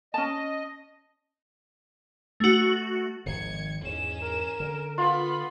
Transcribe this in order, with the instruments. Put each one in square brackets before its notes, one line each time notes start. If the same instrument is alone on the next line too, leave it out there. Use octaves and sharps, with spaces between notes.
[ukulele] C#4 A5 [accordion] D#5
[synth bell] A3 F#4
[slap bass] G#1 D#3 F3 [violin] G#6 C#7
[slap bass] E2 G#2 [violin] C#4 E7
[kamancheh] A#4
[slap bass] D3
[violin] B3 B5 [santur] F4